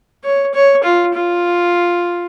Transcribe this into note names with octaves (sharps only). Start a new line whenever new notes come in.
C#5
C#5
F4
F4